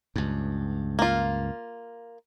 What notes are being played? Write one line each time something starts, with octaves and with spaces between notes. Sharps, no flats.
C#2 G2
A#3 F4